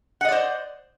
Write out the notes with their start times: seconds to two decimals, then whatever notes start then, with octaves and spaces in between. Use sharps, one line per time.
0.21 F#5
0.25 D#5
0.28 D5
0.32 C5